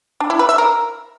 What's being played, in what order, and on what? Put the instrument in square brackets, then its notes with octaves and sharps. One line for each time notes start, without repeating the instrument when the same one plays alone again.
[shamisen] D4
E4
B4
E5
A#4